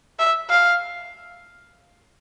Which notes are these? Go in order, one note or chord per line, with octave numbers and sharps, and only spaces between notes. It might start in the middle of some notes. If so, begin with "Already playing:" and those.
E5
F5